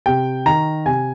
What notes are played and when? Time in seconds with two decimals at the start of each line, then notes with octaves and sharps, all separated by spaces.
0.06 C3 G5
0.46 D#3 A#5
0.86 C3 G#5